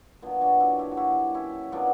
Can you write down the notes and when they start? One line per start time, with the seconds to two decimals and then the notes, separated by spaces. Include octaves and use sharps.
0.22 A#2 F#3 B3 D4
0.41 D4 F#4
0.60 E4 G4
0.79 E4 G4
0.91 F#4
0.97 E4 G4
1.34 C#4 E4
1.72 A#2 F#3 B3 D4